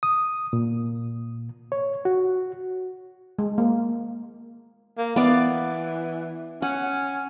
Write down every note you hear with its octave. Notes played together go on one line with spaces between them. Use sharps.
D#6
A#2
C#5
F#4
G#3
A#3
A#3
E3 B3 D5 F5
C#4 F#5